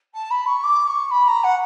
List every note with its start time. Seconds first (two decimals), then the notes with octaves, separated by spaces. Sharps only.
0.14 A5
0.30 B5
0.46 C#6
0.63 D6
0.87 C#6
1.10 B5
1.27 A#5
1.43 F#5